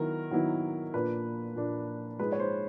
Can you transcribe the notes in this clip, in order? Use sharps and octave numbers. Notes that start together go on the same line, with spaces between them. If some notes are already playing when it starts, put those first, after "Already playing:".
Already playing: D#3 F#3 B3 E4 A#4
D#3 F#3 B3 E4
A#2 F3 A#3 D4 B4
A#2 F3 A#3 D4
G#2 F3 G#3 B4
C#5
C5